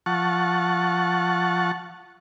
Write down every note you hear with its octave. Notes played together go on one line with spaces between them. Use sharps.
F3 F#5 A5 C#6